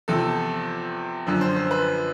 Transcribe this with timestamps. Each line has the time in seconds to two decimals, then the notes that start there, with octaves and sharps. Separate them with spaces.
0.08 E2 C3 F3 A4
1.27 F#2 D3 F3
1.41 C5
1.56 C5
1.71 B4